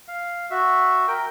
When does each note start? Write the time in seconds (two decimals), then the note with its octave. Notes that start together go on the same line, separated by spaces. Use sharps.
0.08 F5
0.51 F#4 E5
1.08 A#4 G5